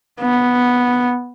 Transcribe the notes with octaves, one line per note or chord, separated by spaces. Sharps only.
B3